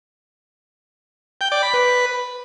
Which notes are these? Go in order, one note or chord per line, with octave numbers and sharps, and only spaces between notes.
G5
D5
B5
B4